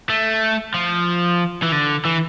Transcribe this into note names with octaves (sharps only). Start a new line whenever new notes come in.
A3
F3
E3
D3
E3